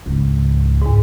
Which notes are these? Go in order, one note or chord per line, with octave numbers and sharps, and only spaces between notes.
C#2 G#2
E2 G#2